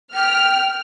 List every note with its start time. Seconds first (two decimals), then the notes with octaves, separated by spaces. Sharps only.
0.14 G5 F6